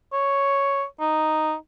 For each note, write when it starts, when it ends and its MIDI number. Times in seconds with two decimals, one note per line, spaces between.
0.13 0.84 73
1.00 1.54 63